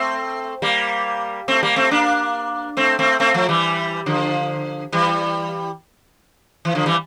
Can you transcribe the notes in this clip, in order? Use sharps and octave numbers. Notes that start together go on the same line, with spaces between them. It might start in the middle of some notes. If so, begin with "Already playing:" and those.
Already playing: A3 C4
G3 A#3
A3 C4
G3 A#3
A3 C4
A#3 D4
A3 C4
A3 C4
A3 C4
F3 A3
E3 G3
D3 F3
E3 G3
E3
D3 F3
E3 G3